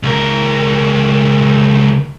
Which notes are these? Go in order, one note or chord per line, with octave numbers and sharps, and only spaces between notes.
C#2 A#4